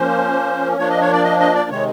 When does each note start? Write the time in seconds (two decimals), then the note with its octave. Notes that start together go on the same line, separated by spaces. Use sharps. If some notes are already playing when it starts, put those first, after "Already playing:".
Already playing: F3 A#3 C#4 C5
0.78 F3 A#3 D4 C#5
0.90 D#5
1.01 C#5
1.12 D5
1.24 D#5
1.39 D#5
1.55 D5
1.70 C3 D#3 G#3 C#5